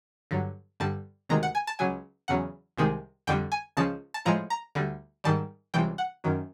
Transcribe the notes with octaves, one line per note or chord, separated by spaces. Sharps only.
G2 D3 F#3
G2 D3 G3 A5
D2 C3 D#3 G#3 A#5
F#5
G#5
A5
C#2 C#3 F#3 G#5
E2 C#3 F#3 F#5
C2 C3 D#3 G#3
F2 D3 G3 G5
G#5
C#2 C#3 F3 A5
A5
A2 F3 G#3 A#5
A#5
D2 D3 G3
G#2 D#3 G3 A5
C#2 C3 E3 G3 G5
F#5
F#2 D#3 F#3